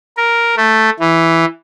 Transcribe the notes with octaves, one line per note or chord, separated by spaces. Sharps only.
A#4
A3
E3